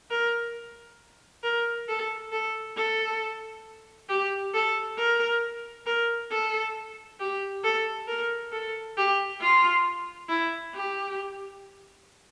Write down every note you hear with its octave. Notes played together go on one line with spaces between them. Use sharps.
A#4
A#4
A4
A4
A4
G4
A4
A#4
A#4
A4
G4
A4
A#4
A4
G4
F4
E4
G4